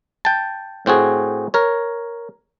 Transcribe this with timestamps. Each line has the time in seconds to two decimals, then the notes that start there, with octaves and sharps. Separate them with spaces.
0.25 G5 A5
0.86 A2 C4 F#4 G#4
1.54 A#4 C#5